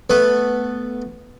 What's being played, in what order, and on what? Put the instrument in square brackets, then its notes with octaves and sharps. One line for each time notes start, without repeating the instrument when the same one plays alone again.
[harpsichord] A3 B3 B4